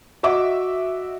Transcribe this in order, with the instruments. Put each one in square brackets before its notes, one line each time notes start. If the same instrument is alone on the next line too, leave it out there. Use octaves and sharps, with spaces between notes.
[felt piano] F#4 D#5 E5 D6